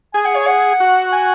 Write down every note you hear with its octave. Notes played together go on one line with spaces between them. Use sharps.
G#4 G#5
F#5
C#5
F#5
F#4
G#5